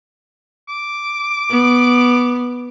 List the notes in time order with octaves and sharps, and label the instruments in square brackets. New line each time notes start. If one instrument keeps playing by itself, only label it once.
[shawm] D6
[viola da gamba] B3